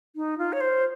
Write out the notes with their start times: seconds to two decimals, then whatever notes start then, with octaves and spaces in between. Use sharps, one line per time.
0.16 D#4
0.38 F4
0.53 C#5
0.61 C5